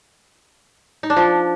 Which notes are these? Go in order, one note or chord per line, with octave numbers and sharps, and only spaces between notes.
D#4
D4
F3